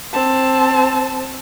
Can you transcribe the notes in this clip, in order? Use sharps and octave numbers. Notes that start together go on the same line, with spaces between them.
C4 A5